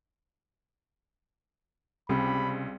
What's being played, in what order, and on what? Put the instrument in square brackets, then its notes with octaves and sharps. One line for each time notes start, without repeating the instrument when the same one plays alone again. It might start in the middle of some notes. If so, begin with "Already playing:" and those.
[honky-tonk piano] C#2 [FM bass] C3 [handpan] G3 C4 G4 [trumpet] B5